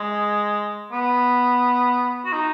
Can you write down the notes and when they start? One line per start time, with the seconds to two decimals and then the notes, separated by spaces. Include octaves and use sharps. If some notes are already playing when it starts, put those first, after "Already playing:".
Already playing: G#3
0.92 B3
2.25 F#4
2.32 D#4